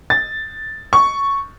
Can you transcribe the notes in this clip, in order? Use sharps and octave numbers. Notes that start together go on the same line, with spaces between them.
A6
C#6